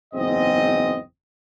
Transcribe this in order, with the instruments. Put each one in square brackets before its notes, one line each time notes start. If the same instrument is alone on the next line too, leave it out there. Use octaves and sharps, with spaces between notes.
[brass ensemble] F#1 E2 G#2 C4 D#5